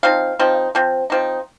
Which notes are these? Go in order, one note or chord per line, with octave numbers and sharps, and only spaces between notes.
F3 C4 D#4 F5
F3 C4 D#4
F3 C4
F3 C4 D#4